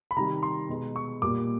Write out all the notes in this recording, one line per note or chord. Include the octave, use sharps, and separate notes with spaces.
B5
C3 D#3 G3 A#5
C6
B2 G#3
C#6
A#2 G3 A#3 D6